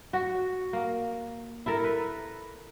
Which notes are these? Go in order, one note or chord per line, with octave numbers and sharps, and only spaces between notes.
F#4
A#3
E4 A4 A#4
B4